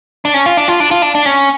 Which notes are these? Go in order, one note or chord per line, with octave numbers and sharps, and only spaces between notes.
D4
C#4
F4
D4
F4
D4
F4
D4
D4
C#4